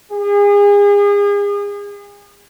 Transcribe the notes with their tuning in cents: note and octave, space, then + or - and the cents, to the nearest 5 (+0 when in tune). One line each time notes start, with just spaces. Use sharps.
G#4 -35